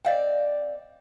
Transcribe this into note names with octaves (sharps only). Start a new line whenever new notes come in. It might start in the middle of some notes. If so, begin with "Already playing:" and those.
C4 D5 D#5 F5 G5